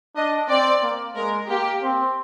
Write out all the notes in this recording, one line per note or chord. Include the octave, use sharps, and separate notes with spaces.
D4 D#5
C4 D5
A#3
G#3 A#4
A#3 G4
C4